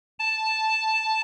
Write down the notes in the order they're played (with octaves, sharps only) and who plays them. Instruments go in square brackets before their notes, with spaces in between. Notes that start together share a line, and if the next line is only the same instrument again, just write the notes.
[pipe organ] A5